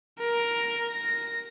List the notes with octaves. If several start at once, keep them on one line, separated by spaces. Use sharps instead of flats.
A#4
A#6